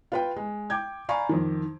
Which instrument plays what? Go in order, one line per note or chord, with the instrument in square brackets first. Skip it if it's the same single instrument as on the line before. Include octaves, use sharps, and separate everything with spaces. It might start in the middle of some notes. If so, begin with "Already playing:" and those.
[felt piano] F4 B4 G5
G#3
G5 D6 G6 G#6
D5 F5 G#5 A#5 B5 C#6
F2 D#3